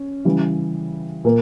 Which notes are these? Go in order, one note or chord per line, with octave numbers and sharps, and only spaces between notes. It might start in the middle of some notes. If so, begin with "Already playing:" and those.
Already playing: C#4
C#3 E3 G3
A#2 A#3